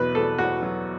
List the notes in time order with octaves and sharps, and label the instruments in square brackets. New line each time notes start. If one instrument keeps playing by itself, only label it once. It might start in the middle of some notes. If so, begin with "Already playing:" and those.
Already playing: [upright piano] E2 B2 F#3 [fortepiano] B4
[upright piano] E2 [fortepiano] A4
[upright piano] E2 [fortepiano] F#4
[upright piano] F#3